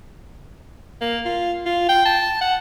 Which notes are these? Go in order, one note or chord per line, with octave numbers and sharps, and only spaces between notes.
A#3
F4
F4
G5
A5
F#5